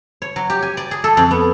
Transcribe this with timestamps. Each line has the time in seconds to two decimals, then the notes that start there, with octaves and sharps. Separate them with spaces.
0.22 C#5
0.36 F#3
0.50 G4
0.62 G#5
0.77 D5
0.91 G#4
1.04 A4
1.17 F2
1.31 B3